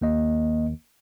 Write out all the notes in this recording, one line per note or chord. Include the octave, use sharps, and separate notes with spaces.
G1 D#2 A#3 D#5